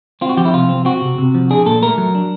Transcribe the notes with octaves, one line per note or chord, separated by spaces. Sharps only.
C4 F4
F#4
F3 G4
E4
C3 F4
C4
C4 F#4
C3
C3
F3
D4 G#4
A#2 A4
A3 A#4
F#3
D4